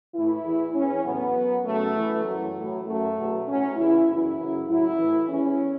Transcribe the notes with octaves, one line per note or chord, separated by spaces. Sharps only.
A2 E3 E4
E2 E3
E2 E3 C#4
A2 F#3 B3
F#2 F#3
F#2 C#3 F#3 A3
F#2 E3
F#2 E3 F#3
A2 F#3
F#2 F#3 A3
E2 B2 F#3
A2 F#3 C#4
E2 C#3 E3 E4
F#2 C#3 E3 E4
F#2 C#3 F#3
A2 F#3 E4
A2 E3
E2 E3 C#4